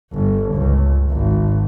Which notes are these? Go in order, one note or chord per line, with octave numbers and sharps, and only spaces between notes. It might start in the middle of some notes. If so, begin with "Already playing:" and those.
G1
C#2
G#1